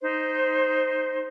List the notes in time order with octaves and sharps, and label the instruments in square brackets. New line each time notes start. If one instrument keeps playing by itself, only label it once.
[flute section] D#4 C5